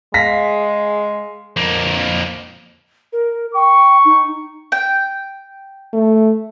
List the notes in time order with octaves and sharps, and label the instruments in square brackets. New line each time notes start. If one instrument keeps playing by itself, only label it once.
[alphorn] G#3 [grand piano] F5 A#6 B6
[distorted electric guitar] F2 A#3
[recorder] A#4
[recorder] G5 [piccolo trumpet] C#6
[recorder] D#4
[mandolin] G5
[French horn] A3